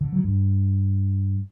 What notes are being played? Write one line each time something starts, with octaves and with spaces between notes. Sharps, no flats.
D3
F#3
G2